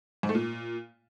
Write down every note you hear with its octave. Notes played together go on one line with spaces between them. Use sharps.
G#2
A3
A#2